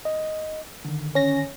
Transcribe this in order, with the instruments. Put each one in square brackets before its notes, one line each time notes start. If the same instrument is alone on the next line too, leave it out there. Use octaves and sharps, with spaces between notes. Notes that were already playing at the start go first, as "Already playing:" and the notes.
[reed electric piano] D#5
D3 D#3
[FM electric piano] C#4 A#6